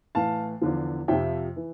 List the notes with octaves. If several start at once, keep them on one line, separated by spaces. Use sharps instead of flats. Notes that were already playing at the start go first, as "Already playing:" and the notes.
A2 E3 F5 A5
E2 D3 F3
F2 C3 F3 E5 G5
E3